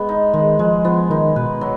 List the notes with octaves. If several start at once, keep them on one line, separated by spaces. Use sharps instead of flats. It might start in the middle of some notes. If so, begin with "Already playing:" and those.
Already playing: G#3 B3
D#4
D#3 G#3
F3 G#3
F3 B3
D#3 D#4
B2 B4
F#3